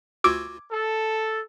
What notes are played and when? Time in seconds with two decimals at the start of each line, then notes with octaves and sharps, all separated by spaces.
0.24 D2 F4 F#4 D6 E6 G#6
0.71 A4